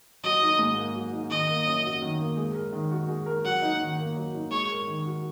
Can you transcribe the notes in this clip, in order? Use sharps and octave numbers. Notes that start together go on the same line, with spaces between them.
F#3 D#5
D#4
G#2
A#3
F#3
D#4
D#3 D#5
A#3
F#2
F#3
D#3
A#3
G#3
A#4
D#3
F#4
G#3
A#4
F#3 F#5
D#4
D#3
A#3
F#3
D#4
G#3 C#5
A#4
D#3
F#4